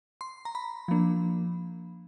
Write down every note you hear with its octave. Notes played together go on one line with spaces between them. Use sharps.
C6
A#5
B5
F3 A#3 D4